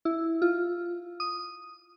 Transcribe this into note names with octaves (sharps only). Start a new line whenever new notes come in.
E4
F4
D#6